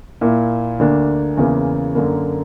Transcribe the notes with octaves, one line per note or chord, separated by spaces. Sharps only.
A#2 A#3 E4
D2 D3 A#3 D4
E2 C#3 E3 A#3 E4
F#2 D3 A#3